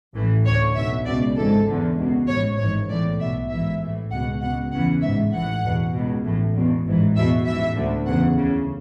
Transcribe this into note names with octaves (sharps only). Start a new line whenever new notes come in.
A1 A2 E3
D2 D3 C#5
B1 B2 E5
C#2 B2 D5
G#1 G#2 E3 A4
E2 D3
C#2 B2
A1 G#2 E3 C#5
G#1 G#2 E3 C#5
B1 A2 E3 D5
B1 B2 E5
A1 G#2 E3 E5
A1 A2 E3
C#2 B2 F#5
C#2 B2 F#5
E2 C#3 E3 F#5
A1 G#2 E3 E5
A1 A2 E3 F#5
E2 B2
C#2 B2
A1 A2 E3
E2 B2
A1 G#2 E3
E2 B2 E5
A1 G#2 E3 E5
D2 D3
E2 C#3 E3 F#5
D2 C#3 E3